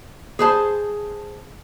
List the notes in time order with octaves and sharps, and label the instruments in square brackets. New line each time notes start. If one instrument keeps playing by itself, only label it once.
[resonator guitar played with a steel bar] G#4 C5 A5